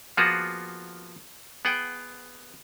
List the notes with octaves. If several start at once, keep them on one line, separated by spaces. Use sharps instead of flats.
F3 A#3 B3 F4 F#4 G#4
B3 G#4 F#5 G5